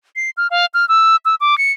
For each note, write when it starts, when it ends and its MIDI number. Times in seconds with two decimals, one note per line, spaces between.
0.16 0.30 96
0.37 0.47 89
0.51 0.66 77
0.74 0.88 89
0.89 1.16 88
1.25 1.35 88
1.41 1.58 86
1.58 1.72 97